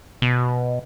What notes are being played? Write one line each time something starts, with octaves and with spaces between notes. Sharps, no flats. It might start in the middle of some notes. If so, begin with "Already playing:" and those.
B2